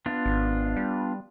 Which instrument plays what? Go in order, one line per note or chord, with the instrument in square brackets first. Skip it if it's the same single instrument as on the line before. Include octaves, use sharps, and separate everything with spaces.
[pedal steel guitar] B3 D4 F4
[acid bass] G#1
G3